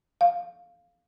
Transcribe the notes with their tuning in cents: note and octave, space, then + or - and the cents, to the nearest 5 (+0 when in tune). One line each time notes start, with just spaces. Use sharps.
F5 +5